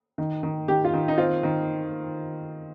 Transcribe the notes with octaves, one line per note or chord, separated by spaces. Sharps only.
D#3
D#3
D#3 G4
F4
D#3
D#4
C4 F4
D#3